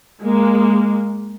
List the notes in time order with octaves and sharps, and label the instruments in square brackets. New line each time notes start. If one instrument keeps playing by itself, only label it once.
[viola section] G#3 A#3